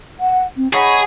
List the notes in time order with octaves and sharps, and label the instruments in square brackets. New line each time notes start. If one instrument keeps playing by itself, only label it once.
[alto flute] F#5
C4
[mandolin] D#4 C#5 B5 [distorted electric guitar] G#4 [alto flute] F#5